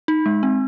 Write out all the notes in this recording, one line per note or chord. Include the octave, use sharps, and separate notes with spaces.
D#4
G#3
C4